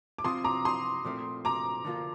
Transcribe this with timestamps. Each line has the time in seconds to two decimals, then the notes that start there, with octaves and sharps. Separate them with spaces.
0.18 D6
0.24 C3 F3 C4 F4 C6 D#6
0.44 A#5 D6
0.65 C6 D#6
1.05 A#2 F3 A3 C4
1.45 A#5 D6
1.85 D3 F3 A#3 F4